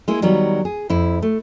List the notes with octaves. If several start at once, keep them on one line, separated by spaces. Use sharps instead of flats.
G#3 A#3 E4
D#3 F#3 G3 B3
G#4
F2 E4
A3